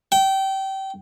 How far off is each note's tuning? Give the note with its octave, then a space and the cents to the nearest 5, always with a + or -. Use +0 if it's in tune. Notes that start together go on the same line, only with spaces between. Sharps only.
G5 -25